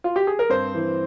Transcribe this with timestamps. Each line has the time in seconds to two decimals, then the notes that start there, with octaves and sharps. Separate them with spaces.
0.04 F4
0.16 G4
0.27 G#4
0.39 A#4
0.49 G2 C4 C5
0.75 E3